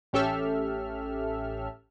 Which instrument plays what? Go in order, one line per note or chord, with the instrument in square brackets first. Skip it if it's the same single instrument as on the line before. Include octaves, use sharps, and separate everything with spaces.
[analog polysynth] A1 C#4 G4 A4 E5 F6